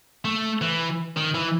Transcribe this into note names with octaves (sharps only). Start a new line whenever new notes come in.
A3
E3
D#3
E3